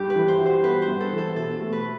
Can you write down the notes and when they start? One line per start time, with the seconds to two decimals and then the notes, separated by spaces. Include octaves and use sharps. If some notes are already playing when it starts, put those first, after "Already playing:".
Already playing: G2 G4
0.10 B4
0.15 E3
0.28 C5
0.39 F#4
0.46 C5
0.64 B3 B4
0.82 C5
0.88 G2
1.01 A4
1.13 E3
1.18 A4
1.36 B2 A4
1.61 A3
1.73 B4